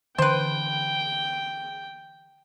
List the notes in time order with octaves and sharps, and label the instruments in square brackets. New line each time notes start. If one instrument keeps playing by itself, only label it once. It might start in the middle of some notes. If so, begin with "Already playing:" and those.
[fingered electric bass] D3 E3 [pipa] B4 C5 [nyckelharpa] G5